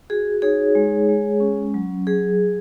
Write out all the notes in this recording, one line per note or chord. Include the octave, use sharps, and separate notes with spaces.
F#4 G#4
D#4 G#4 C#5
G#3
G#3
C#4
F#3
F#3 G#4
F#3